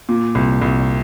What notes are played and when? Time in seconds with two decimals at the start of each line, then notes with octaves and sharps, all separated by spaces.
0.09 A#2
0.35 C2
0.62 C2